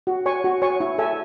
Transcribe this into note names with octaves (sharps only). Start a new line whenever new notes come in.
F#4
C#5 G#5 C#6
F#4
C#5 G#5 C#6
E4
A4 E5 G#5